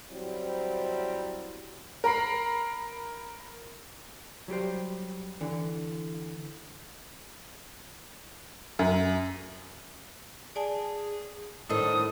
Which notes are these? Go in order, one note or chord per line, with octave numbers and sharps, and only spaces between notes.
F#3 G3 C4 E4
A#4 A#5 B5 C7
F#3 G3 G4 C5
D3 E3
F#2
G#4 D5 G#5 A5
A2 D#3 D4 E4 A4 C5 D#6